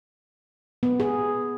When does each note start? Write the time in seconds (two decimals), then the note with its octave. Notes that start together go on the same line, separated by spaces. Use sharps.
0.83 B3
1.00 G#4